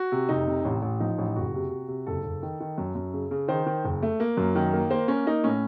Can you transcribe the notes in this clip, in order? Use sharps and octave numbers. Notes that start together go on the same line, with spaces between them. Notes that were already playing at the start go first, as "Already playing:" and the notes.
Already playing: F#4
C3
F1 D#4
C3
A1
A1
F3 D#4
A1
F#1 F#4
C3
C3
C3
F#1 A4
F#1
D#3
D#3
F#2
F#2
C#3
C#3
D#3 C5
D#3
F#1
A3
A#3
F#2
D#3
A#3
A#3 C5
A#3 C#4
A#3 D#4
A2 C#4